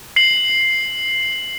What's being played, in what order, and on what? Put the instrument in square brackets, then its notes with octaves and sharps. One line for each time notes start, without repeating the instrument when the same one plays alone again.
[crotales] C7 F#7